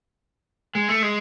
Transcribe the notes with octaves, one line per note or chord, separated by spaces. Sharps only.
G#3
A3
G#3